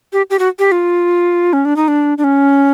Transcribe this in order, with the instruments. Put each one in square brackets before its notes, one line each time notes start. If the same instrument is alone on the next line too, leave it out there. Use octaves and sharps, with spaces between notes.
[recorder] G4
G4
F#4
G4
F4
C#4
D4
D#4
D4
D4
C#4